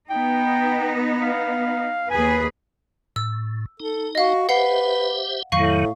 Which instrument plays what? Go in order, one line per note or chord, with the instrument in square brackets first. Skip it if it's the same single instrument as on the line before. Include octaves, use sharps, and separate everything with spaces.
[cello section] B3 D#4 [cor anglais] G5
[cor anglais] F5
[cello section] D#2 G#4 B4 [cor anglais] G#5
[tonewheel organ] A2 [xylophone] E6
[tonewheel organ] D#4 [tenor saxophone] A4
[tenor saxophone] F#4 [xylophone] D#5 F5
[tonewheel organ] G4 C5 E5 [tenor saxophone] B4 [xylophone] F#5 C7
[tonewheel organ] F2 D#3 F#3 [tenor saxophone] A2 [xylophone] F5 C#6